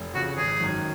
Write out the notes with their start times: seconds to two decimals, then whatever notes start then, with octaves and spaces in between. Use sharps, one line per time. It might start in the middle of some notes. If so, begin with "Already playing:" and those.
Already playing: F1
0.14 F2 C#3 F3 F#4
0.37 G#1 G#4
0.60 F#2 D#3 F#3